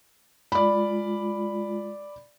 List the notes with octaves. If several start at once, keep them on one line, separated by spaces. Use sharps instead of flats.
G#3 F4 D5 B5